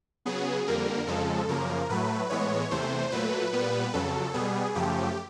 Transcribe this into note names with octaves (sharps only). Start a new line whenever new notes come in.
C#3 F#3 B3 G#4
F2 D3 G3 A#3 A#4
F2 C#3 F3 G#3 A4
F#2 C#3 F3 A#3 A#4
A2 F#3 A3 B4
A2 E3 G#3 B3 C#5
E2 C3 E3 A3 C5
A#2 F#3 A3 B4
A#2 G3 B3
F2 C#3 F#3 A4
B2 G3 B3 G#4
F#2 C#3 F3 A3 G4